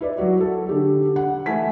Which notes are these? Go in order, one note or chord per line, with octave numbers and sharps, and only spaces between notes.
E4 B4 D5
F#3 F#4
A4
D3 G4
F#5
E3 A3 G#5 B6